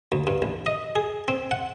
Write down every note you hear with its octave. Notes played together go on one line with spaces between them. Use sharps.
D2
G2
A1
D#5
G#4
C4
F#5